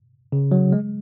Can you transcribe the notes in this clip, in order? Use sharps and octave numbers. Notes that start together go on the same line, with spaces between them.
C#3
F#3
G#3